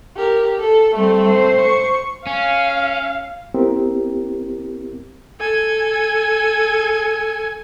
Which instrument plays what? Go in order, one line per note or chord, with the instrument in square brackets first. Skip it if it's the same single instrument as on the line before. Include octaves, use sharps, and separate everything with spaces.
[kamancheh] G4 A#4
A4
[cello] G3 [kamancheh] A3 C4
[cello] C5
[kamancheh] C#6
[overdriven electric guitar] C#4 [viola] F5
[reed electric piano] B3 C4 E4 G4 A#4
[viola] A4 G#5